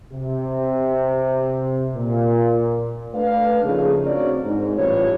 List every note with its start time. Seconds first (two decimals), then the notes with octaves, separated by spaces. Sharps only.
0.13 C3
1.95 A#2
3.14 A3 D4 B4 F5
3.63 C#3 F3 A3 A#3 D#4 G#4
4.05 C4 D4 F#4 A#4 C#5 D5
4.45 G#2
4.76 A1 G2 F4 C#5